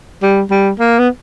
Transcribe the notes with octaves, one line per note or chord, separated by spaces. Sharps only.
G3
G3
A#3
B3